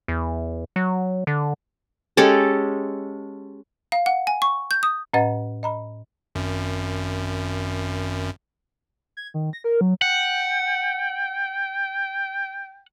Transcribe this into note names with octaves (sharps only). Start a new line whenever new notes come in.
E2
F#3
D3
G#3 C#4 G4 A4
F5
F#5
G#5
C#6
G6
D#6
A2 C#4 B4 D#5 F#5 A6
D#5 A#5 B5
G#1 F#2
G#6
D#3
A#6
A#4
F#3
F#5 G5